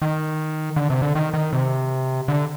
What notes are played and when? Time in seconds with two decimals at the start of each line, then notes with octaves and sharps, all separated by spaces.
0.02 D#3
0.76 D3
0.90 C3
1.02 D3
1.15 D#3
1.34 D#3
1.53 C3
2.28 D3